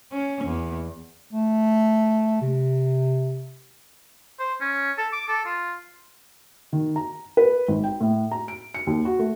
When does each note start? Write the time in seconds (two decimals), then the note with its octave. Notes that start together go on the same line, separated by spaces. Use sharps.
0.12 C#4
0.45 E2
1.32 A3
2.42 C3
4.39 C5
4.61 C#4
4.98 A4
5.12 D6
5.28 A4
5.45 F4
6.73 D#3
6.96 A#5
7.37 B4
7.68 G#1
7.84 G5
8.00 A2
8.31 A#5
8.48 D7
8.74 C#7
8.87 D#2
9.05 F#4
9.19 A3